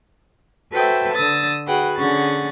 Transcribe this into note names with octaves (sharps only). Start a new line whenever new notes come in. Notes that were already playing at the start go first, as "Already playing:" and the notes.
F#4 A4 B4 C5 E5 G5
D3 D#6 E6 A6
F#4 G#4 B4 F#5 G5
D3 C#4 G#4 F#5 C#6 A6